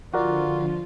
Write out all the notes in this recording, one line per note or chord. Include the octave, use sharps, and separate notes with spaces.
D3 F3 F4 F#4 A#4 D5